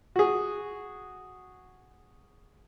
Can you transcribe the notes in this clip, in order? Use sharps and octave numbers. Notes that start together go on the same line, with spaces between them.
F#4 G#4